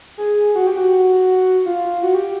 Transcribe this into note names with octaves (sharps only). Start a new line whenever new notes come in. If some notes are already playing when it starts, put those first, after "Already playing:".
G#4
F#4
G4
F#4
F4
F#4
G4